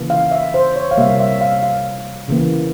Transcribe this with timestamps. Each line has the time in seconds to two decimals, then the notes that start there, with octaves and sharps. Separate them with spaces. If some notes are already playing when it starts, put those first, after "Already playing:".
Already playing: C#3 E3 A#3
0.10 F5
0.32 E5
0.54 C5
0.76 C#5
0.91 F5
0.97 C3 G3 A#3 E5
1.19 E5
1.41 F5
1.63 F5
2.28 C#3 E3 A#3